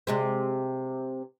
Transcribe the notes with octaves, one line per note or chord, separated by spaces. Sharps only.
C3 G#3 C4